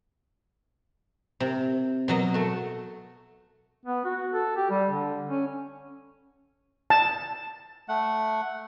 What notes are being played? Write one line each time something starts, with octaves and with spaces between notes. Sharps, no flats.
C3
B2 F#3 D#5
A3 F#4
B3
F#4
A4
G4
G3
D3
C#4
A5
A3 F#5